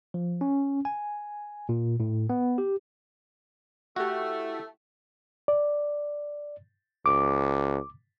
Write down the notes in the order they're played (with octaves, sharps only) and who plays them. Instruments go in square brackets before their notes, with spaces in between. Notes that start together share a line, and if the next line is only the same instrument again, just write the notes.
[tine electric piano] F3
C#4
G#5
A#2
A2
B3
G4
[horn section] A3 [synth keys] E4 G4 [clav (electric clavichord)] F#4
[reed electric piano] D5
[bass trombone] C#2 [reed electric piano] D6